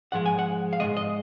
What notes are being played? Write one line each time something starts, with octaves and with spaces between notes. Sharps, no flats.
G#2 F3 G#3 F#5
G#5
F#5
F5
G#2 F3 G#3 D#5
D#5